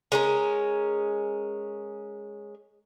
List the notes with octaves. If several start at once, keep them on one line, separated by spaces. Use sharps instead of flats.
G#3 C#4 A#4